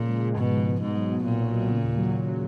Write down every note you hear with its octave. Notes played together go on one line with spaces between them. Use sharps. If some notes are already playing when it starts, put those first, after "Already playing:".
Already playing: A#2 C#3 F3
G#3
G#3
G#2 B2
G#3
B3
G#2 B2
F#3
B2
B1 A#2
F#3
B2
C#3
D#2
F#3
F#3
F#3